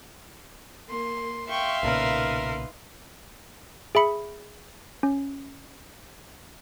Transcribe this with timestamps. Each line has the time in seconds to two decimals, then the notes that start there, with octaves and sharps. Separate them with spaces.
0.90 A#3 C6
1.50 E5 F5 G5 C6 C#6
1.83 B1 A#2 C#3 D#4 A#4 B4
3.95 G#4 E5 B5 C#7
5.03 C#4